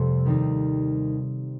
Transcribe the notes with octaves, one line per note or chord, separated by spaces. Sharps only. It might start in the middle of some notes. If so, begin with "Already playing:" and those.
Already playing: F1 F2 C3 G3 A4 C5
D#2 D#3 G3 C4 D#4